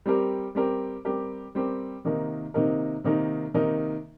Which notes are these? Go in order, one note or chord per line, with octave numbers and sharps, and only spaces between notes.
G3 C4 G4 A#4
G3 C4 G4 A#4
G3 C4 G4 A#4
G3 C4 G4 A#4
C3 D#3 A#3 D#4 A#4
C3 D#3 A#3 D#4 A#4
C3 D#3 A#3 D#4 A#4
C3 D#3 A#3 D#4 A#4